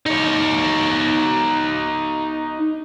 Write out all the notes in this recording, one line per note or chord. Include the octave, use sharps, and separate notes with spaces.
D#4 C#5